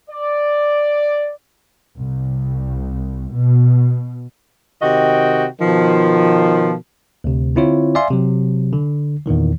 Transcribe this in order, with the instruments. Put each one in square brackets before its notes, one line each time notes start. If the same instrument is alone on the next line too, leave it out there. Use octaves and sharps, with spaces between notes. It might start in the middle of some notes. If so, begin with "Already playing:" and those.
[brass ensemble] D5
[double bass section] C2
B2
[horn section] C3 D#3 F#4 D#5 G5
B2 D#3 F3
[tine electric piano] D2 C3
D3 C4 E4 F4 C#5
D5 E5 F5 G#5 C6
C3 F#3
D3
E2 A#2 D#3 E3